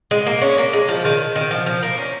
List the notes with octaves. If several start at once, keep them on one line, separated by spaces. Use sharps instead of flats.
G#3
A#3
C#4
A#3
G#3
F3
D#3
D#3
F3
F3
A#3
C#4